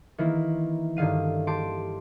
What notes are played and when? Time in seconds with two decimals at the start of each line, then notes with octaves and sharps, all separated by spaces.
0.18 D#3 E3 A#3 E4
0.97 G2 D3 D#3 F5 D#7
1.47 G4 A5 C6 D7